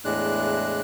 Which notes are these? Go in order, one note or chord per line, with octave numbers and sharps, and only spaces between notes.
E2 A2 G#3 D4 F#6